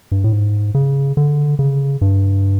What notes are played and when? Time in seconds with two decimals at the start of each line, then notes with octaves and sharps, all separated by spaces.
0.12 G2
0.24 A2
0.33 G#2
0.75 C#3
1.17 D3
1.59 C#3
2.01 G2